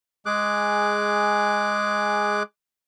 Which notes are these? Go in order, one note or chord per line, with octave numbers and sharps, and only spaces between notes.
G#3 G#4 D6 F#6